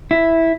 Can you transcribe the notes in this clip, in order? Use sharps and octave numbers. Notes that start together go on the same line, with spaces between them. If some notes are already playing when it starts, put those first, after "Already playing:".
E4